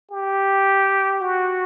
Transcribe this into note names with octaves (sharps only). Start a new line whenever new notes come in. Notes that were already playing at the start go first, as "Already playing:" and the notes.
G4
F#4